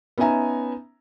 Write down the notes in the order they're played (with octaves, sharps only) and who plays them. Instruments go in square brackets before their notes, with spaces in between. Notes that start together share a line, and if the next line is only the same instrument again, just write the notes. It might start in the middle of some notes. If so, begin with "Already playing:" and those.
[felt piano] B3 C#4 D#4 E5 G#5 A#5